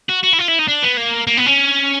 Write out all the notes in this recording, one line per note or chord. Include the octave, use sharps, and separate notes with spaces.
F#4
F#4
E4
F4
E4
D#4
D4
B3
A#3
A#3
B3
C#4